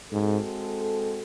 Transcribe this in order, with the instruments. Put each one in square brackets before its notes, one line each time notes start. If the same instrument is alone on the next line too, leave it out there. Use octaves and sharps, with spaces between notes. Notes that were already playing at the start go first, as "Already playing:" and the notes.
[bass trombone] G#2 [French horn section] G#3 C4 F#4 A4